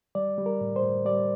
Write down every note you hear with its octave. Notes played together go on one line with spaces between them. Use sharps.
G3 D5
G3
A#4
A2
C5
A2
G3 D5